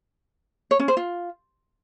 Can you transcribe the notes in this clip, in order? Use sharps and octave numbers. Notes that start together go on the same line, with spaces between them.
C#5
C#4
C5
F4